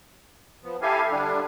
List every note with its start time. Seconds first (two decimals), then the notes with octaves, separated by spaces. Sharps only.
0.63 F3 B3
0.82 E4 G4 A4 F5 G#5
1.11 D3 G3 D4